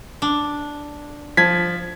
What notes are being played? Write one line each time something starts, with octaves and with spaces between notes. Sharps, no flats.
D4
F3 G#6 B6